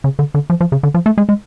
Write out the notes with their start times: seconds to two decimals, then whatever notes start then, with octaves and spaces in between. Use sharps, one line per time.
0.04 C#3
0.19 D3
0.34 D3
0.50 F3
0.61 F3
0.72 C#3
0.83 D3
0.94 F3
1.06 A3
1.18 G#3
1.29 G#3